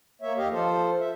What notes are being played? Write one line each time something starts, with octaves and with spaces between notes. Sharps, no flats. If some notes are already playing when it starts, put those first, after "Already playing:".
A#3 C#5 E5
D#2 G4 D#5 F5
F3 F4 A4 C5
E5